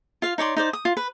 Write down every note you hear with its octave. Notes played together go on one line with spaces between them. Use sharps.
F4 F5
D#4 C#5 D5 C6
D#4 C5 D5
D#6
F4
B4